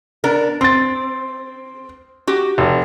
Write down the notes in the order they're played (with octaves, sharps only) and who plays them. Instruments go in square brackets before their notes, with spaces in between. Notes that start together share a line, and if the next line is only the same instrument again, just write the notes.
[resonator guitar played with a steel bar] B3 D4 A#4
[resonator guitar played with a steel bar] C4 [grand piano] C6 A6
[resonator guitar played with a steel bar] F#4 G4
[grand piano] F1